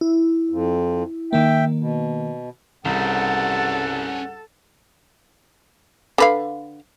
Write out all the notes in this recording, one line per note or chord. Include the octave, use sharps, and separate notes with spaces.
E4
F2
D#3 A#3 E5 G5
B2
C2 G2 C#3 C#4 A4 C5 F#5
D3 B4 F5